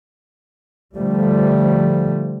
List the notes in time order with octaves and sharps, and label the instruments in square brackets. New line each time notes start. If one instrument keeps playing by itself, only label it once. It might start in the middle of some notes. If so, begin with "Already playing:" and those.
[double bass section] D3 F3 G3 A3